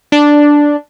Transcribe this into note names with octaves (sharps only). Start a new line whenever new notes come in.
D4